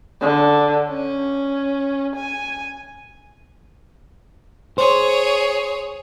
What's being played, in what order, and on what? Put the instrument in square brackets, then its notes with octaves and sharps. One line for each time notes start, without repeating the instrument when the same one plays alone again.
[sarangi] D3
C#4
G#5
[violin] G#4 C#5 [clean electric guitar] C5